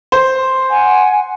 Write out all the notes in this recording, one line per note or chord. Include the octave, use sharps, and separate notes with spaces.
C5
F#5 G#5